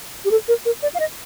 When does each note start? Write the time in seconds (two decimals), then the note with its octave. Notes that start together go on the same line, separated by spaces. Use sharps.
0.25 G4
0.31 A4
0.48 A#4
0.66 A#4
0.83 D5
0.95 F5
1.00 D#5